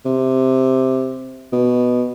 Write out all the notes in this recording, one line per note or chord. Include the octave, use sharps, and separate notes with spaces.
C3
B2